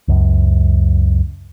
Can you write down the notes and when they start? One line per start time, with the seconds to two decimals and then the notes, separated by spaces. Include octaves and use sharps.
0.08 C#2 F#2